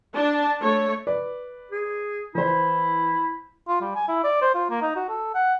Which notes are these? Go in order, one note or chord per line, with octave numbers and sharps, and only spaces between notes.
D4 A5
A3 C#5
B4 D5
G#4
E3 E4 C5
F4
G3
G#5
E4
D5
C5
F4
A#3
D#4
F#4
A4
F#5